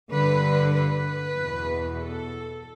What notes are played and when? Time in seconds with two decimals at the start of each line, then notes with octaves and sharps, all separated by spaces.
0.12 G2 D3 B4
0.75 B4
1.38 E2 B2
2.01 A4